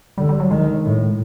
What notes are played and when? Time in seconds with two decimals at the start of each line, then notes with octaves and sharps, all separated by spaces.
0.18 D3 G3
0.29 G3
0.40 F#3
0.51 D#3 G#3
0.84 A2